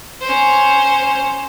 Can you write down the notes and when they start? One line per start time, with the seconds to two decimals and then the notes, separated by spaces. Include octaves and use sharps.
0.21 C#4 C5